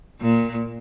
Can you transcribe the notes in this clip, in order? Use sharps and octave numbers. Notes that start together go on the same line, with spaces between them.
A#2